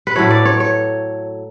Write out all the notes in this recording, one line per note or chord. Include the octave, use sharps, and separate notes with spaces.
B4
A2 F#3 A3 C#5
D5
C#5
C#5